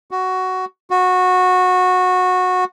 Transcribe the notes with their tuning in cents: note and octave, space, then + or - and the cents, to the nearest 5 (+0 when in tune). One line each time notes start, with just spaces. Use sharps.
F#4 +10
F#4 -15